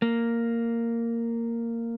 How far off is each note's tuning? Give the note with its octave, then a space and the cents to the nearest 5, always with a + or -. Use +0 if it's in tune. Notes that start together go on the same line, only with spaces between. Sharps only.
A#3 -10